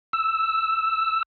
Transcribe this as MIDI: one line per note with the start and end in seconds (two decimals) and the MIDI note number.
0.13 1.23 88